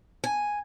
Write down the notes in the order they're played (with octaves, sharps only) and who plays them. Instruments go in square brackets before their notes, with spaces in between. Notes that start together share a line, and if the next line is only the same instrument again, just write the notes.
[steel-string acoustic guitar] G#5